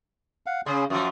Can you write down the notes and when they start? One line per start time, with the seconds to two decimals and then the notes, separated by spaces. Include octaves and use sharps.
0.46 F5 F#5
0.66 C#3 C#4 G#4 C6
0.90 F#2 F3 F#4 D#6